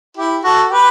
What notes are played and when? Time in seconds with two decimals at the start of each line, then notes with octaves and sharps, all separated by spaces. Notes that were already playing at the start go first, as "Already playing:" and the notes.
0.17 E4 G4
0.44 F#4 A4
0.71 G4 B4